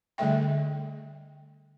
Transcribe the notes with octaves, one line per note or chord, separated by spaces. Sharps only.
D3 G3 A3 A4 E5 G5